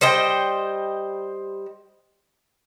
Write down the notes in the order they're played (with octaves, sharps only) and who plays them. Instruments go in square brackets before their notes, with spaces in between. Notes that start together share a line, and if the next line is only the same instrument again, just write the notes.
[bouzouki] G3 C5 D#5 G5